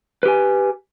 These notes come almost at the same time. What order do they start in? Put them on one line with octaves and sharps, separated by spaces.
B4 G4 G#5